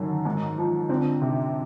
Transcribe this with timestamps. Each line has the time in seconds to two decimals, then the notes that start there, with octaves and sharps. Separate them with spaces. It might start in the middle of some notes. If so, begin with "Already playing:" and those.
Already playing: F#2 D3 D#3 D#4
0.25 G#2
0.58 F3
0.89 D3 C4 D4
1.21 C3